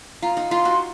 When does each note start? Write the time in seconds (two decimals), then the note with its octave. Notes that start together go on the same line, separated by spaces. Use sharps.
0.22 F4 A#5
0.37 D#4
0.51 F4 C6
0.65 F#4